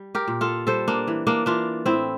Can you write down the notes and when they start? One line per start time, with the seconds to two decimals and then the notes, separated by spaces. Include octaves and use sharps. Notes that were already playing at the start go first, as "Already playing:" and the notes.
Already playing: G3
0.15 G4 A#4
0.28 A#2
0.41 F4 A4
0.67 G3 A4 C5
0.88 A#3 D4
1.07 E3
1.27 A#3 D4
1.46 E3 D4 F4
1.86 A2 C4 E4